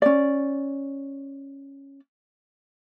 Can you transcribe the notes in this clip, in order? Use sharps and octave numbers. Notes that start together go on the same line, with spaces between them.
C#4 D5